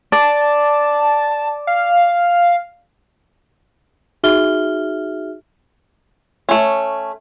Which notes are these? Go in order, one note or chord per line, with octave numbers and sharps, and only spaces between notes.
D5 A5
F5
D#4 F#4 G#4 E5 F6 G7
A3 C#4